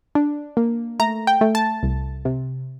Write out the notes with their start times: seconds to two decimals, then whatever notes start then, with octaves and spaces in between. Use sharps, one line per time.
0.15 D4
0.57 A#3
1.00 A3 A#5
1.27 G5
1.41 A3
1.55 A5
1.83 C2
2.25 C3